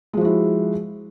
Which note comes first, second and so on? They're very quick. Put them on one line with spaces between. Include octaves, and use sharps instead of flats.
G#3 F3 F#4 E4